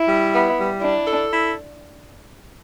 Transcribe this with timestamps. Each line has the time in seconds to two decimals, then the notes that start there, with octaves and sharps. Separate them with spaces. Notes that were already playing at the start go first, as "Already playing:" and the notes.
Already playing: E4
0.08 G3
0.32 B3
0.58 G3
0.82 D4 E4
1.08 A4
1.32 E4